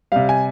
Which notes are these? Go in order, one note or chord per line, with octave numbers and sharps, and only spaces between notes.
C3 G3 F5
G#5